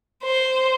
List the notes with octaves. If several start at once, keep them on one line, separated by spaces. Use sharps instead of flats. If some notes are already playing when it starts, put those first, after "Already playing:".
C5